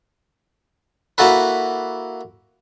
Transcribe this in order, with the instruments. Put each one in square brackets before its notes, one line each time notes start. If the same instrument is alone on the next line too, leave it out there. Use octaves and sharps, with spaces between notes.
[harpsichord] A#3 E4 F#4 A4 B4